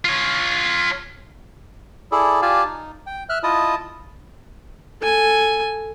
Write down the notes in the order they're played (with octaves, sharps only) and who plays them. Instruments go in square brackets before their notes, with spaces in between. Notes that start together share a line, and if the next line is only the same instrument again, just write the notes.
[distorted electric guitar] F4 C#5
[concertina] E4 G#4 A4 D5
F4 G4 D5 F5 G#5 A5
D#4
G5
E5 F6 F#6
E4 F4 D#5 A5 D#6
[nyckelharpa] A4 G#5